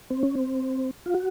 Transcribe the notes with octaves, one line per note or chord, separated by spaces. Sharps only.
C4
C#4
C4
F4
F#4